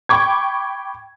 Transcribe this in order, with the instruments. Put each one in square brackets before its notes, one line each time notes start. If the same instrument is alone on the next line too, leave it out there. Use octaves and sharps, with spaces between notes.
[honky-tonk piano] G5 B5 C#6 D6 G#6